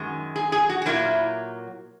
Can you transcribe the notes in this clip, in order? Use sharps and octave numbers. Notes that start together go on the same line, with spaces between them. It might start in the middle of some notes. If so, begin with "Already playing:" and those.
Already playing: F#2 D#3 G#3
G#4
G#4
F#4
F#4
A#2 F#3 A#3 E4